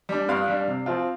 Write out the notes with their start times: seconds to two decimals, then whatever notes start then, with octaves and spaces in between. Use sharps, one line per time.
0.09 G3 D4
0.29 G2 F5
0.48 G3 D4
0.68 C3
0.86 F3 C4 F4